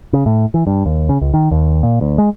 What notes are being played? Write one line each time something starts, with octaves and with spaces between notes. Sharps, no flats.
C#3
A2
E3
G2
D#2
C#3
C#2
D#3
D#2
A#2
D2
G#3